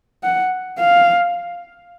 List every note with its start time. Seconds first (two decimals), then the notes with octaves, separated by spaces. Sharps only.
0.23 F#5
0.78 F5